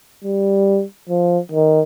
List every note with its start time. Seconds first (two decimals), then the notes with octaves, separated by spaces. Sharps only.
0.24 G3
1.09 F3
1.51 D#3